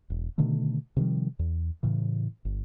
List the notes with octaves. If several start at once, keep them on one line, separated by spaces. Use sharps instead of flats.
E1
B2 D3 D#3 A3
C3 D#3 F3 G3
E2
A2 C#3 E3
G1